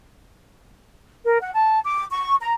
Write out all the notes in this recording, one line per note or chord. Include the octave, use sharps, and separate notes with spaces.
A#4
F#5
A5
D6
C#6
A#5